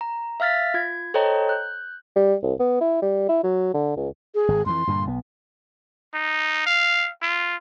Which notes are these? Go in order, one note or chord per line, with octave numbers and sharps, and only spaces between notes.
A#5
E5 F5 F6 A6 B6
F4 G#6
A4 C5 C#5 D#5 G5 A#5
F#6 G6
G3
C2
B3
E4
G3
E4
F#3
D3
C#2
G#4
G#1
F2 E3 C6
G2 A#2 D3
B1 B3
D#4
F5
F4